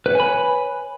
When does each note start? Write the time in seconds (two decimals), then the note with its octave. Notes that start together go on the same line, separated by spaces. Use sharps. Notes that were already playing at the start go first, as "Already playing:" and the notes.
0.06 B4
0.10 C#5
0.15 G#5
0.20 B5